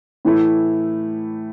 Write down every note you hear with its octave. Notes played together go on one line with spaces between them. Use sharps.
A2 E3 A3 E4